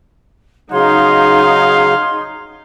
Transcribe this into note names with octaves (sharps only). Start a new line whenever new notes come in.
C#3 F#3 D#4 G#4 F5 C6 G#6